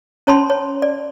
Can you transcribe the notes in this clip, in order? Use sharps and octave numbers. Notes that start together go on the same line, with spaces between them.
C#4 C#5 A5 B5 C6
C#5
D5